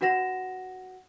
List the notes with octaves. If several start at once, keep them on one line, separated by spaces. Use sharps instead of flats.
D4 F#4 B4 F#5 A#6 E7